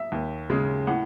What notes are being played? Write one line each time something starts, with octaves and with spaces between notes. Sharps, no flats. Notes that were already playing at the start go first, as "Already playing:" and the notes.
Already playing: E5
D#2
C#3 G#3
A2 F#5